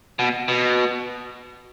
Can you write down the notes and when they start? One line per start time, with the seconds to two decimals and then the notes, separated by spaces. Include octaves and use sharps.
0.19 B2
0.48 B2